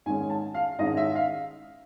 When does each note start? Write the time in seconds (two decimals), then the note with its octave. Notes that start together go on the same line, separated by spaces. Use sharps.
0.06 G#2 D#3 G#3 C#4 G#5
0.30 A5
0.54 F5
0.78 G#2 D#3 G#3 C#4 D#5
0.97 E5
1.15 F5